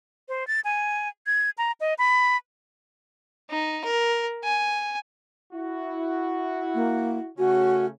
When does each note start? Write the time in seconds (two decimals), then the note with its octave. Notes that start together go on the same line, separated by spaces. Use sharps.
0.29 C5
0.47 A6
0.64 G#5
1.27 G#6
1.58 A#5
1.80 D#5
1.98 B5
3.50 D#4
3.84 A#4
4.44 G#5
5.53 E4 F#4
6.74 A#3
7.38 C#3 A3 C#4 F#4